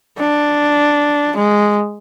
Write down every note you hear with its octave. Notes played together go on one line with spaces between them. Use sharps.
D4
G#3